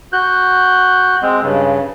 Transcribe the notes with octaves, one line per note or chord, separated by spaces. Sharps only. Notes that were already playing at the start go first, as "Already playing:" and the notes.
F#4 F#6 G6
G#3 C4
G2 C#3